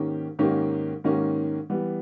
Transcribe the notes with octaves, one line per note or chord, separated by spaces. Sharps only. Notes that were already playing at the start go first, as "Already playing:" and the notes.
Already playing: G#2 D#3 A#3 C#4 G4
G#2 D#3 A#3 C#4 G4
G#2 D#3 A#3 C#4 G4
E3 G3 B3